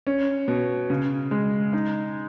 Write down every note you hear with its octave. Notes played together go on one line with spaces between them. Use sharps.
C#4
B2
C#3
G#3
D#4